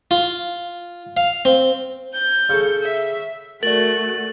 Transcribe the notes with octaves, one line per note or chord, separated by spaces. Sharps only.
F4
F5
C4
G6
C#3 A4
E5
A3 F#4 A#4 D5 A6 F#7